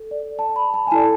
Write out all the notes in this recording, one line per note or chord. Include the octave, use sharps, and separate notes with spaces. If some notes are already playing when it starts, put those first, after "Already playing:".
Already playing: A4
D5
A5
B5
A5
G#5
E4 A4 D5 A5